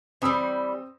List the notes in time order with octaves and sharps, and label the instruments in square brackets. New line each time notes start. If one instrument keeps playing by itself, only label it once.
[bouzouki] E3 G3 [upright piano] C4 D#6 E6